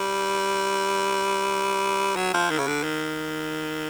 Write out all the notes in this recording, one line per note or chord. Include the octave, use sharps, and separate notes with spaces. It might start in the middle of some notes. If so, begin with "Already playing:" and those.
Already playing: G3
F#3
F3
D#3
C#3
D3
D#3